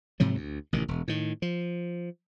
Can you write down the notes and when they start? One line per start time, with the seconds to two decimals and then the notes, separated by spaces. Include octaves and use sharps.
0.20 G#2 C3 F3 F#3
0.35 D2
0.73 A1 C3 D#3
0.88 E1
1.08 A2 D#3
1.42 F3